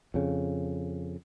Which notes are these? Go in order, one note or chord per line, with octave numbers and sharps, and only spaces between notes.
F2 C#3